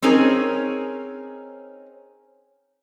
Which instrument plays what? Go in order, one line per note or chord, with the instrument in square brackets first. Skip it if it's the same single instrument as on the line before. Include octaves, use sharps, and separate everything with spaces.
[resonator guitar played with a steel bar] C4 C#4 D#4 G#4 A#4